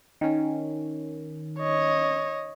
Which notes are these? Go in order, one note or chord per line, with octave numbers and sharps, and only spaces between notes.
D#3 C#4
C#5 D#5